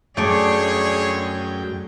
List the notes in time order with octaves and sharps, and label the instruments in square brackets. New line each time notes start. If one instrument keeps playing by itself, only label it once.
[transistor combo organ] F#2 G5 [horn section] D3 C#5 [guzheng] A3 D5 [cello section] G#4